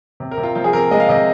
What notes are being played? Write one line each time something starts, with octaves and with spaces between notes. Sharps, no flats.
C3
A#4
C3
F4
F3 F4
G#4
C3 A#4
G#3 D#5
F5
C3 D#5